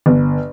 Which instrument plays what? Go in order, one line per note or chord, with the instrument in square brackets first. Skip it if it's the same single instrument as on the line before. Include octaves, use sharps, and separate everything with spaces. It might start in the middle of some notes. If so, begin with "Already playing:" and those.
[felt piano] G1